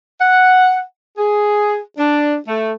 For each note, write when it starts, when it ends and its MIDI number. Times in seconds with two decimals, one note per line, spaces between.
0.20 0.80 78
1.17 1.78 68
1.98 2.36 62
2.47 2.71 57